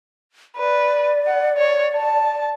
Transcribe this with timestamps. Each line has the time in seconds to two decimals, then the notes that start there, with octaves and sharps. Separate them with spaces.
0.57 B4 D5
1.27 F#5
1.57 C#5
1.96 A5